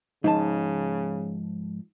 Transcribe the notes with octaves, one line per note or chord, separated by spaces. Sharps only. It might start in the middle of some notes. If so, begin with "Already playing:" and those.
G#2 C#3 F3 D#4 A5